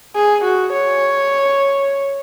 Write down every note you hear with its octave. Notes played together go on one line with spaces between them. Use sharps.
G#4
F#4
C#5